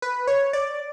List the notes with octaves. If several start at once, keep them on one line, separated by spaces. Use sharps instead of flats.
B4
C#5
D5